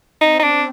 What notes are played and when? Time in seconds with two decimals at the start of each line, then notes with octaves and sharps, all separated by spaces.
0.21 C4 D#4
0.39 D#4
0.44 D4